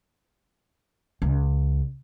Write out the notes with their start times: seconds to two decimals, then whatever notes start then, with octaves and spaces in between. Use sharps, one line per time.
1.22 C#2